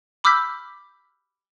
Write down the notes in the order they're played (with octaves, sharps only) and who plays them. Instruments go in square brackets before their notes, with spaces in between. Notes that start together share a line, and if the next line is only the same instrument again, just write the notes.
[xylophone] B5 D6 E6 F6 G6 B6